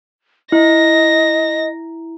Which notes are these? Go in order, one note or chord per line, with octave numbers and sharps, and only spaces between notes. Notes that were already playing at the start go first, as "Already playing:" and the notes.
E4 D#5 A#6